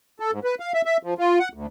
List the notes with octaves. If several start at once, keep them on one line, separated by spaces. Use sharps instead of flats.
A4
G#2
B4
F5
E5
E5
F3
F4
F#5
D2